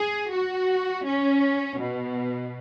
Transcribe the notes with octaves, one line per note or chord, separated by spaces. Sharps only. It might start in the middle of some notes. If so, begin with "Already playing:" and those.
Already playing: G#4
F#4
C#4
B2